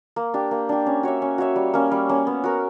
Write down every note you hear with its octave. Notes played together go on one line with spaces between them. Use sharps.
A#3
D4 G4
A#3
D4 G4
C#4
F#4 C#5 E5
C#4
F#4 C#5 E5
G3
A#3 C#4
G3
A#3 C#4
B3
F#4 A#4